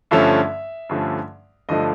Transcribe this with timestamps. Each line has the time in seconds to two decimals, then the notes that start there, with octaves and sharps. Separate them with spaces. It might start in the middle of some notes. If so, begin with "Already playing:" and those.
0.11 G2 D3 F3 A3 C#4 E5
0.89 G2 D3 F3 A3 C#4
1.69 G2 D3 F3 A3 D#5